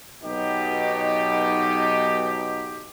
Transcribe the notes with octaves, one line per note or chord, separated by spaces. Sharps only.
B1 B2 D#4 G4